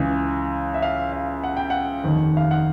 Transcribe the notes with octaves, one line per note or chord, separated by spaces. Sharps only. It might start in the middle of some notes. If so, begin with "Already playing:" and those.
Already playing: C#2 C#3 E3
E5
F5
F5
F#5
G5
F#5
F1 D#2 D#3
F5
F#5